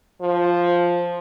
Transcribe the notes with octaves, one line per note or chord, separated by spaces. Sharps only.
F3